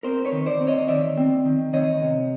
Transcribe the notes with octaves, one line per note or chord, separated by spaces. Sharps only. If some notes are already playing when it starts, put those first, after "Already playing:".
C4 A#4 C5
B4 C#5
D#3
C5 D5
C4
C#5 D#5
D#3 D5 E5
C4
D#3
D#3 C#5 D#5
C3